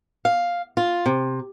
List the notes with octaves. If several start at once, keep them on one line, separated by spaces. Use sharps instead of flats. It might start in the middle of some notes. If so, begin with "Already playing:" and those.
F5
F4
C3